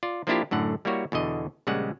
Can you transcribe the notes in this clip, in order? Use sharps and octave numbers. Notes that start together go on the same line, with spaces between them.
F4 D5
F3 A#3 D4 E4 F4 G4
F#2 A2 D3 F#5
G3 A#3 E4 F#4 C#5
E2 B2 D3 D#5
A#1 C#3 G3 G#3 F#5